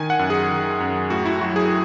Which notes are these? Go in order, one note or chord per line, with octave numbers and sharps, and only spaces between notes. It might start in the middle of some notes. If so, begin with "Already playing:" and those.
Already playing: D#3 G#5
F#5
F#2
G#4
D#3
F#2
A2 F#4
E4
F#3 F#4
G#4